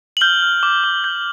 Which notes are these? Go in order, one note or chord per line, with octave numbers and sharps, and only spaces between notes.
F#7
F6 G6 G7
F6
D6
D6
G6